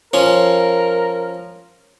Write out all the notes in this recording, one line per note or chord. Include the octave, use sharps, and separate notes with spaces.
F3 C#4 A#4